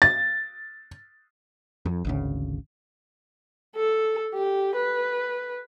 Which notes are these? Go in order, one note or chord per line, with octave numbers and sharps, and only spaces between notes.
A6
F2
G#1 D2 C#3
A4
G4
B4